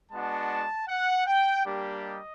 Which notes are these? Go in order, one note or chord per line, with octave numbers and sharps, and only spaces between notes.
G#3 B3 D4 F#4 A5
F#5
G5
G3 A#3 D4 G4
D#5